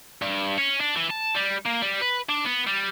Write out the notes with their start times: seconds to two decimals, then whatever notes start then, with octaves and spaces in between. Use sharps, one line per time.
0.22 G2
0.58 C#4
0.80 D4
0.96 E3
1.10 A5
1.35 G3
1.66 A#3
1.82 G3
2.02 B4
2.29 D4
2.45 B3
2.67 G3